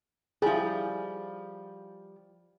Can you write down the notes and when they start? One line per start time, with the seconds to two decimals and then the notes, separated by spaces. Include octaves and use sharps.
0.42 F3 G3 E4 G#4